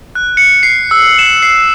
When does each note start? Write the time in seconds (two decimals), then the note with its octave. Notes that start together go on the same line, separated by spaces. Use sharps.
0.15 F#6
0.37 C#7
0.63 C7
0.91 E6
1.19 E7
1.43 C7